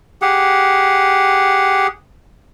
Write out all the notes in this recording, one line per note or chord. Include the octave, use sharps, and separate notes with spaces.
G4 G#4 F#5